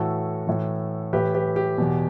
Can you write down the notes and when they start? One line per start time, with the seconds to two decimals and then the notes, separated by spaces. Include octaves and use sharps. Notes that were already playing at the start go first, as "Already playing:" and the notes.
Already playing: A2 E3 F#4 A4
0.47 A2 E3
1.13 A2 E3 G4 B4
1.34 G4 B4
1.56 G4
1.78 E2 B2